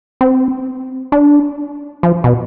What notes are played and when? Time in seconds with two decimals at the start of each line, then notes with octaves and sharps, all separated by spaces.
0.21 C4
1.12 D4
2.03 F3
2.24 B2